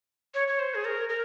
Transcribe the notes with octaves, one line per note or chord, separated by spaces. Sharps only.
C#5
C#5
C5
G#4
A#4
A#4